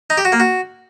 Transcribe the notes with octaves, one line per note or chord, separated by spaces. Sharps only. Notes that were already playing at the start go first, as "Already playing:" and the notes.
D#4
G4
F#4
A#3
F#4